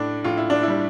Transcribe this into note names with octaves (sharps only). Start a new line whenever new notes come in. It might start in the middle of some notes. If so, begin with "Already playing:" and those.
Already playing: A2 D4
A2 F4
E4
D4
G3 E4